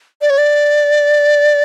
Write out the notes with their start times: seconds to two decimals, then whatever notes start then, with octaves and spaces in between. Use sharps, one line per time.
0.21 D5
0.30 C#5
0.38 D5